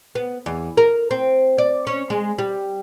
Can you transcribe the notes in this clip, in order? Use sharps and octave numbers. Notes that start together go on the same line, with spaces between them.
B3
E2
A#4
C4
D5
C#4
G#3
G3